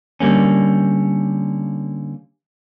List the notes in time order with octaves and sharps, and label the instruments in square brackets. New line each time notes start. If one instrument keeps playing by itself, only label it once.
[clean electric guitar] D3 G3 A#3 C#4